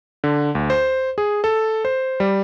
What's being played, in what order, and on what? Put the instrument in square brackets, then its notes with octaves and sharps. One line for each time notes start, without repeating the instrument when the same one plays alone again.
[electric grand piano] D3
D2
C5
G#4
A4
C5
G3